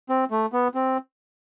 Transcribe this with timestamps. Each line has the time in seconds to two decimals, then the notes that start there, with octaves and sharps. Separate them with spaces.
0.09 C4
0.31 A3
0.53 B3
0.75 C4